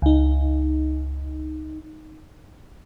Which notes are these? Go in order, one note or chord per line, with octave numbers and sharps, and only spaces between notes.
C#2 D#4